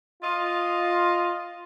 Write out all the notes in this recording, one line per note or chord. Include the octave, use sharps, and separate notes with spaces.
F4 D#5